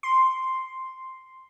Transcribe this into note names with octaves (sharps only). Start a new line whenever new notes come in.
C6